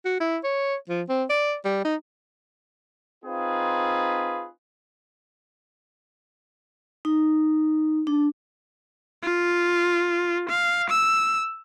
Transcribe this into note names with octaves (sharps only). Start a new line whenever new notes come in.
F#4
E4
C#5
F3
C4
D5
G3
D#4
C4 D#4 F4 G#4 B4
D#4
D4
F4
F5
E6